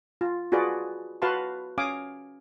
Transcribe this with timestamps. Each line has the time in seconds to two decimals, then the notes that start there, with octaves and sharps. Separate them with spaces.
0.21 F4
0.52 F4 F#4 G#4 B4 D5
1.22 F#4 B4 F5 A5 C6
1.78 C#4 F5 G#5 D6 D#6